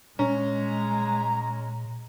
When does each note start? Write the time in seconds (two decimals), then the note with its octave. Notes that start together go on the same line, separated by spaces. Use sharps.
0.19 A#2 G#3 C#4 A#5